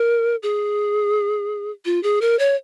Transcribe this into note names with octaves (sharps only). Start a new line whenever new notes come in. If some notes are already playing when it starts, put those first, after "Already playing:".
Already playing: A#4
G#4
F4
G#4
A#4
C#5